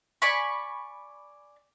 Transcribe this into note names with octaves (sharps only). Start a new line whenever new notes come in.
D5 G#5 B5 C#6